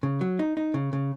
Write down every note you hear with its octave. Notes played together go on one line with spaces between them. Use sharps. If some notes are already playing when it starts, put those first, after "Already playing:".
C#3
F#3
D#4
D#4
C#3
C#3